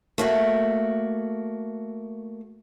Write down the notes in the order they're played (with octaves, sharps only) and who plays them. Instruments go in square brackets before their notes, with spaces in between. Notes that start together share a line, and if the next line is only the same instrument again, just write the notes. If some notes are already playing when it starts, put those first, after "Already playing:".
[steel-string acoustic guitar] A3 A#3 F#4